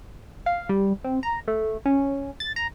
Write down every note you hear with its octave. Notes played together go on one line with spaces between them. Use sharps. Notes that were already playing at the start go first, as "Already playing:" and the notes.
F5
G3
C4
A#5
A3
C#4
A6
A#5